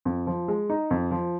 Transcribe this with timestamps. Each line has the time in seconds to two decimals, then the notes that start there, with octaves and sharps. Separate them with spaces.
0.05 F2
0.27 F3
0.48 G#3
0.70 D#4
0.91 F2
1.11 F3